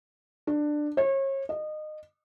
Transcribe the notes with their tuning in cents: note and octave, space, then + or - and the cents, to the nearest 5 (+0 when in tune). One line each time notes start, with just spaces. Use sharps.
D4 +15
C#5 -35
D#5 -25